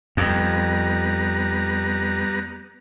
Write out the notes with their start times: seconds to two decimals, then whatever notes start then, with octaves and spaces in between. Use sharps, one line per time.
0.17 F2 G3 B3 A#5